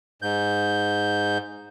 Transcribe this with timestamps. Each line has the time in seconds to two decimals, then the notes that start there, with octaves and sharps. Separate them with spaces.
0.22 G#2 G6